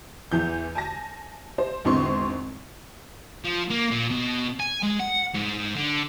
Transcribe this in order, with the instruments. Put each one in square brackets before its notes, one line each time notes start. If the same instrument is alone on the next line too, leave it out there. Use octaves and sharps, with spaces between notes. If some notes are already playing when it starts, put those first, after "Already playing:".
[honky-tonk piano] E2 E3 G6
G#5 A5 A#6
C5
G#1 E2 D3 C4 C6 C#6
[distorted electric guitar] F3
A#3
A#2
B2
G#5
G#3
F#5
G#2
D3